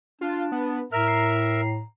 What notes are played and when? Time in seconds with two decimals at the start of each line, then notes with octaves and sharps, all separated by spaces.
0.21 D4 F4
0.52 B3
0.92 A2 A#4 E5 A#5 F6
1.08 C7